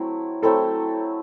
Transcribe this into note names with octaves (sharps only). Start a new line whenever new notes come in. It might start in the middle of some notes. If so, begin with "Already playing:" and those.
Already playing: F#3 A3 C4 E4
F#3 A3 C4 E4 A4